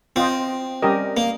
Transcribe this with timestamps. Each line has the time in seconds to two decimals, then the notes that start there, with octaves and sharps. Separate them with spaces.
0.16 C4 F4 C5 D#5 G5
0.82 G3 C#4 G4 A#4 D#5
1.17 A#3